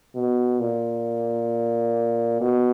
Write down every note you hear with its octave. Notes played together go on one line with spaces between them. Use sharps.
B2
A#2
B2